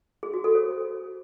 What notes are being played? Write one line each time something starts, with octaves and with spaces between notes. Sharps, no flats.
G#4
F#4
A4
C5